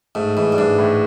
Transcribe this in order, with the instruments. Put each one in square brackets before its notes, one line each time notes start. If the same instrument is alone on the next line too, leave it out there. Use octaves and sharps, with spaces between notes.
[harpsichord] G#2 [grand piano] A3
[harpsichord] G#2 [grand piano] E3
[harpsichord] G2
[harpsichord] G#2 [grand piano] D4
[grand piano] A2